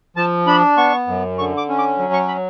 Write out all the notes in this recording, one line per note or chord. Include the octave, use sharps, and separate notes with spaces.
F3 A5
D4 B5
B3 C#6
F#2
D3 C#6
D6
C#4
D6
F#3
C#6
B5